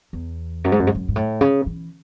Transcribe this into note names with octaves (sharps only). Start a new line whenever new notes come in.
E2
F#2
G#2
F#2
G#2
F#2
G#2
A2
C#3
E3